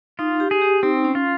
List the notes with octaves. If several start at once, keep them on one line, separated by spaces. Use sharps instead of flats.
D#4 F4
G4
G#4
G4
C4 D#4
C#4
F4